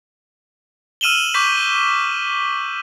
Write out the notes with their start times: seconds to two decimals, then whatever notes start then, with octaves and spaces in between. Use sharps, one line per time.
1.01 E6 F6 D#7 E7 F#7 G7
1.34 C#6 D6 G6 B6